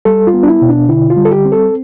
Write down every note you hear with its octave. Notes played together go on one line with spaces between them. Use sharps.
G3 A4
F4
B3
D4
E4
B2
D4
D3 E4
F4
G3
A4
G4
C4
A4